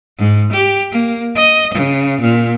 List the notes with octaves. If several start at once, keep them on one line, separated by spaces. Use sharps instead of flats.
G#2
G4
A#3
D#5
C#3
A#2